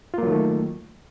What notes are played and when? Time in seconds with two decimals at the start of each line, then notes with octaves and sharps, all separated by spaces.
0.14 F4
0.18 A#3
0.23 F#3
0.27 D#3
0.32 A3